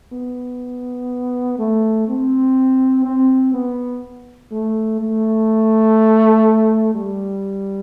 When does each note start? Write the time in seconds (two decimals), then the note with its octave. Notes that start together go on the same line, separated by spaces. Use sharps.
0.13 B3
1.59 A3
2.08 C4
3.05 C4
3.54 B3
4.51 A3
5.01 A3
6.95 G3